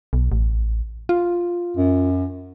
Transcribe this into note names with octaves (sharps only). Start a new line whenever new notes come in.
B1
A1
F4
F#2